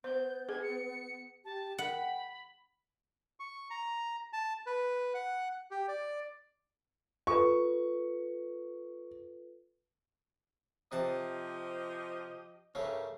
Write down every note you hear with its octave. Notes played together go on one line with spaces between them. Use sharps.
B3 C5 G6
G#4 G#6
C#7
G4 A5
F#5 G5 B5
C#6
A#5
A5
B4
F#5
G4
D5
F4 A4 B4 C#6
C3 F3 G4 D#5 F#5 A5
G2 C#3 A3 C#4 A#4